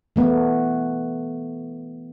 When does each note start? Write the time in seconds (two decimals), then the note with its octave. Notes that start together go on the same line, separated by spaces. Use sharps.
0.16 E3 A3 B3